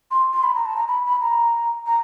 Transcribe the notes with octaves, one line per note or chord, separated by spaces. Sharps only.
C6
C6
B5
A#5
A5
A#5
B5
B5
A#5
A#5